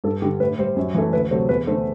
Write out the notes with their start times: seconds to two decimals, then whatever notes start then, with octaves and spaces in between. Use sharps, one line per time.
0.04 G2 A4
0.22 D3 G3 G4
0.40 A2 B4
0.59 G3 C5
0.76 F#2
0.95 E3 A3
1.13 D2 B4
1.31 C3 F#3 A3 C5
1.49 E2 B4
1.67 D3 A3 C5